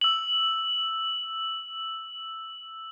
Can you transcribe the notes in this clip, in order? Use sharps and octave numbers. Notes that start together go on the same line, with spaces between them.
E6 F#7